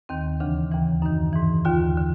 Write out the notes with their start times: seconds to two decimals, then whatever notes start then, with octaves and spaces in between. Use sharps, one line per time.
0.09 D#2 D#3 C4
0.40 D2 C#3 E3 D4
0.71 D#2 C#3 E3
1.02 F#2 D#3 D#4
1.33 G#2 E3
1.65 D#2 D3 F4
1.97 D3